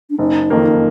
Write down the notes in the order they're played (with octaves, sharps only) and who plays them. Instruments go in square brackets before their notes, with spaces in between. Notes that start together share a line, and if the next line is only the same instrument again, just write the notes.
[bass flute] D4
[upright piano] F#1 [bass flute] D#4
[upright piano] F2 D#3 A#3